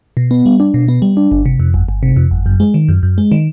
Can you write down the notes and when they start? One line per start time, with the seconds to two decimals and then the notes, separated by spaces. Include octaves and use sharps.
0.17 B2
0.31 B3
0.46 G3
0.60 D4
0.74 B2
0.88 B3
1.02 G3
1.17 D4
1.32 G1
1.46 C3
1.60 F2
1.74 G1
1.89 G1
2.03 C3
2.16 F2
2.31 G1
2.46 F#2
2.60 G#3
2.74 D#3
2.89 F#2
3.03 F#2
3.18 G#3
3.32 D#3